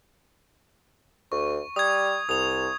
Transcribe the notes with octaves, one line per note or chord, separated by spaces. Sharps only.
D2 C#6
G3 D#6 G#6
C2 D#6 F7